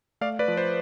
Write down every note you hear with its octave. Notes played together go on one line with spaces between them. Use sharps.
A3 D5 F5
B4 D5
F3
C5